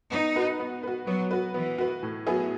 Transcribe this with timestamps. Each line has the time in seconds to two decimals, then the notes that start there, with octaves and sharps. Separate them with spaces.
0.12 B3 D#4
0.36 F#4 B4
0.60 B3
0.83 F#4 B4
1.07 F#3 B3
1.31 F#4 B4
1.54 E3 B3
1.78 F#4 B4
2.03 A2
2.27 F#3 B3 E4 G#4